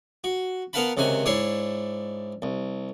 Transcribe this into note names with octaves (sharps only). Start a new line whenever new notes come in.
F#4
B3 A#4 F5 F#5 A5 B5
C#2 C3 D#3 F#5 G#5
G#2 D4 E4 C#5 C6
C2